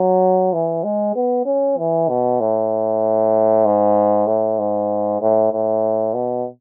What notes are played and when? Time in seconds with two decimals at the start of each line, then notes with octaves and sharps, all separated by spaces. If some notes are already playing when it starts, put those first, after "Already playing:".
Already playing: F#3
0.53 E3
0.84 G#3
1.16 B3
1.46 C#4
1.78 E3
2.09 B2
2.40 A2
3.65 G#2
4.27 A2
4.59 G#2
5.21 A2
5.52 A2
6.14 B2